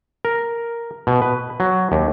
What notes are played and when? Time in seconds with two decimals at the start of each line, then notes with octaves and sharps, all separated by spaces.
0.25 A#4
1.07 B2
1.22 B4
1.60 F#3
1.92 D#2